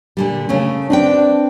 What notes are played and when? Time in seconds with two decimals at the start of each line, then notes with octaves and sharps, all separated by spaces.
0.17 A#2 D3 G3
0.49 C#3 A3 C#4
0.90 C4 D4 B4 G5